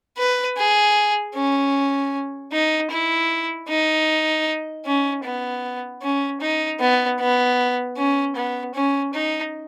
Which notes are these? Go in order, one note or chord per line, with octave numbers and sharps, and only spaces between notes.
B4
G#4
C#4
D#4
E4
D#4
C#4
B3
C#4
D#4
B3
B3
C#4
B3
C#4
D#4